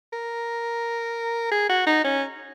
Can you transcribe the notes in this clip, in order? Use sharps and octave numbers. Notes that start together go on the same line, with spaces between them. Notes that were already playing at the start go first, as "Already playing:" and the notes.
A#4
G#4
F#4
D#4
C#4